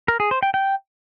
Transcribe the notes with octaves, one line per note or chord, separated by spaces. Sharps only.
A#4
G#4
C5
G5
G5